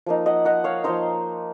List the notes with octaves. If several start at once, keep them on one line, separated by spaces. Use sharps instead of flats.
F3 A#3 D#4
D#5 F#5
D#5 F#5
C#5 F5
F3 A#3 D#4 C5 D#5